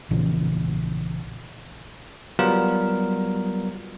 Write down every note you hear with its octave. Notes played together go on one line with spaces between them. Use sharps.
A#1 A#2 C#3 E3
F#3 G3 B3 F4 A#4